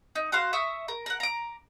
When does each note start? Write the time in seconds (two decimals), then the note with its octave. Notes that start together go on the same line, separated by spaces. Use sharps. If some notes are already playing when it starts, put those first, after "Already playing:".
0.15 D#4
0.32 F#4 C5 F5 C6
0.53 E5 C#6 D#6
0.88 A#4
1.06 A#4 F#5
1.20 A#5 D6